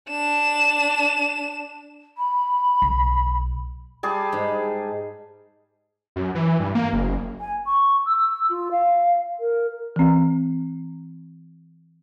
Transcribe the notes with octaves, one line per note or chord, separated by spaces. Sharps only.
D4 E7
B5
B1
G3 G#4 A5
G#2
F#2
E3
G2
A#3
F#1
G#5
C#6
E6
F4
F5
A#4
E3 C4